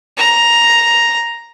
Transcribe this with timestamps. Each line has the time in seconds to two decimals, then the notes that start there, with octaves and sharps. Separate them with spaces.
0.18 A#5